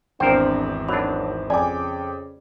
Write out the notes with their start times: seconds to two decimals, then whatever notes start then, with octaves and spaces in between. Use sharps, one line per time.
0.20 G#1 E2 C4 D4 A#4 C5 G5
0.88 D#3 F#3 D4 B5
1.50 F2 C#3 D5 G5 G#5 D6